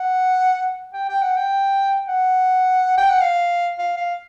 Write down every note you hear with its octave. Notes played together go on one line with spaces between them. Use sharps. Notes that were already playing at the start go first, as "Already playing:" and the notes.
Already playing: F#5
G5
G5
F#5
G5
F#5
G5
F#5
F5
F5
F5